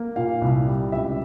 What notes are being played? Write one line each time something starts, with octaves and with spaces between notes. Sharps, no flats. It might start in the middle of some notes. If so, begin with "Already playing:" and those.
Already playing: A#3
A#2 F5
C2
G3
C#2 E5